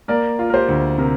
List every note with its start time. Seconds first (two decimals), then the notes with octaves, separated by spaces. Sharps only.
0.08 A#3 A#4 D5
0.39 F4
0.50 A#4
0.54 G4 C5
0.68 D2
0.98 C3 A#4